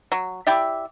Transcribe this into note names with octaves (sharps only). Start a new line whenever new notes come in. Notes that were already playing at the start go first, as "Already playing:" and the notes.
F#3
E4 G4 D5 E5